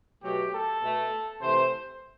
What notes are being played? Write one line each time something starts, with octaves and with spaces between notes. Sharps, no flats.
B2 F#3 A3 G4
A4
B2 A3
C3 E3 A3 C5